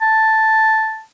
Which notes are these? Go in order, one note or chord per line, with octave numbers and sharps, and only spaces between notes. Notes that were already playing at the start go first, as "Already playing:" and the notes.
A5